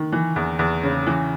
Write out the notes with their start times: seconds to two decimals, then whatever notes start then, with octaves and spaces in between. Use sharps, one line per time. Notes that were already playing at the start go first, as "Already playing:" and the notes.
Already playing: D#3
0.12 E3
0.36 E2
0.59 E2
0.83 C#3
1.07 E3